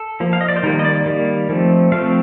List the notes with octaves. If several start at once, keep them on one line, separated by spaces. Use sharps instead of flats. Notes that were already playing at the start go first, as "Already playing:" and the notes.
Already playing: A4
F3 A#3
F5
D#5
D5
C5
D#3 G3 A#3 A#4
D#5
D5
D#3 G3 A#3
F3 A3 C4
F3 A3 C4 F5